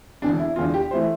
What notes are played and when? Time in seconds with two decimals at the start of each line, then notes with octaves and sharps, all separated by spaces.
0.22 E1 E2 D3 D4
0.39 E4
0.56 E1 E2 D3 F4
0.74 G4
0.91 C5
0.93 E3 A3